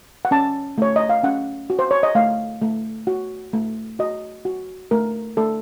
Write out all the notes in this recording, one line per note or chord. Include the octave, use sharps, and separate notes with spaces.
F#5
C#4 A5
A3 C#5
D#5
F5
C#4 F#5
F#4
C5
C#5
D#5
A3 F5
A3
F#4
A3
F#4 D#5
F#4
A3 A#4
A3 A4